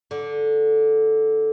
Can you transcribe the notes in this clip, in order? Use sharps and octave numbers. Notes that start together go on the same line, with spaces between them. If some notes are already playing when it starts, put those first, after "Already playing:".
D3